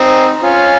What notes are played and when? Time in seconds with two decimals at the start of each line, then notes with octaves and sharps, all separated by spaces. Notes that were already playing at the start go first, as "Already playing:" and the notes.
Already playing: C4 D#4
0.42 C#4 F4